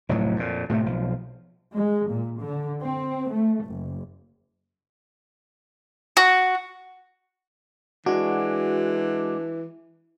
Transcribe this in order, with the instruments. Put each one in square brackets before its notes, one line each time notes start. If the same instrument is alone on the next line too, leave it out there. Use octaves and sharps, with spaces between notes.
[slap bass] F1 D2 A2 F#3
F2 A#2
A2 C3 G#3 A3
B1 F3
[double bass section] G#3
A#2
D3
C4
A3
F#1
[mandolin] F#4
[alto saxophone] E3 [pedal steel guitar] G#3 D4 [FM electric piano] F#4